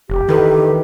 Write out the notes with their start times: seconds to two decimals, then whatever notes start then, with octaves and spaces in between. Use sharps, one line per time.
0.10 F1 G4
0.29 D#3 E3 A4 B4